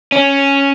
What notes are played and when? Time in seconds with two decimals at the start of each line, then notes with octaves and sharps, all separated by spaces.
0.12 C#4